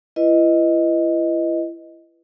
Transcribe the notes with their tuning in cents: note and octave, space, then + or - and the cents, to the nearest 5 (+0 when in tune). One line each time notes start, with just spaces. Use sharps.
E4 +35 B4 +0 D#5 +0